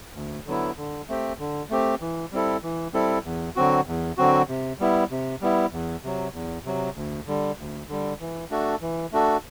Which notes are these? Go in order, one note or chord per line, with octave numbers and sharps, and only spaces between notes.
D2
D3 F#3 B3 E4
D3
A3 C4 G4
D3
A3 C4 G4
E3
G3 C4 E4 A4
E3
G3 C4 E4 A4
E2
D3 F#3 C4 F#4
E2
D3 F#3 C4 F#4
C3
G3 B3 E4
C3
G3 B3 E4
E2
C3 F#3
E2
C3 F#3
D2
D3 G3
D2
D3 G3
E3
A3 D4 F#4 A4
E3
A3 D4 F#4 A4